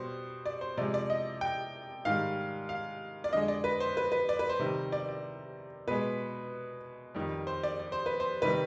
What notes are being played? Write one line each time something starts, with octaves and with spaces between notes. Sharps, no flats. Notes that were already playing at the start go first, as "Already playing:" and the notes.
Already playing: B2 G3 C5
D5
C5
C3 F3 G#3 D5
D5
D#5
G5
G#2 D#3 G3 F5
F5
D5
F2 D3 G#3 D#5
D5
B4
C5
B4
B4
D5
B4
C5
C3 D#3 G3
D5
D5
B2 G#3 B4
F2 D#3 G3
C5
D5
D5
C5
B4
C5
C3 D#3 G3 B4